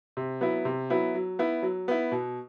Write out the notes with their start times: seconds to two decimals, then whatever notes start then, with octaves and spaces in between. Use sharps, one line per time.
0.17 C3
0.41 F#3 B3 E4
0.65 C3
0.90 F#3 B3 E4
1.14 F#3
1.39 B3 E4
1.62 F#3
1.88 B3 E4
2.12 B2